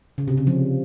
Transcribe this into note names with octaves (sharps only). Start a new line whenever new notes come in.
C#3
C3
C#3
F3